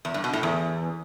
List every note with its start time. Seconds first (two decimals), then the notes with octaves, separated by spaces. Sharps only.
0.05 E2
0.14 G2
0.24 B2
0.33 A2
0.43 E2